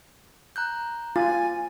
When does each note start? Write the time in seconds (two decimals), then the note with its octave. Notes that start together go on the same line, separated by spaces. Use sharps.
0.56 A#5 F#6 G6
1.16 F4 G#5 A6